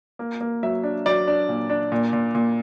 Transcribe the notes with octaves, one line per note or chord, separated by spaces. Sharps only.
A#3
A#3
F#3 E5
D4
F#3 D5
D4
A#2
D4
A#2
A#2
A#2